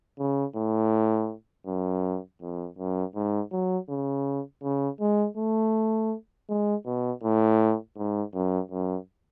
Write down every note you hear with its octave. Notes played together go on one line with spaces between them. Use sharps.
C#3
A2
F#2
F2
F#2
G#2
F#3
C#3
C#3
G#3
A3
G#3
B2
A2
G#2
F#2
F#2